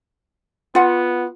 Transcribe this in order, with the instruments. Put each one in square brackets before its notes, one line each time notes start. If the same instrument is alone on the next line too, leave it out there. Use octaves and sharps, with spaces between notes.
[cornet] B3 [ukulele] F4 F#5